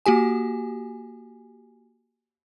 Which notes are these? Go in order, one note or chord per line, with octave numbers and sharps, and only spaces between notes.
A#3 F#4 G4 G#5